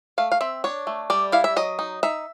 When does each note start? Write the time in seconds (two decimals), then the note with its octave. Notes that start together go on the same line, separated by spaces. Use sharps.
0.18 A3 F5
0.32 F5
0.41 C4 E5
0.64 D4 C#5
0.87 A3
1.10 G3 D5
1.32 E4 F5
1.44 E5
1.56 F#3 D#5
1.79 D#4
2.03 D#4 E5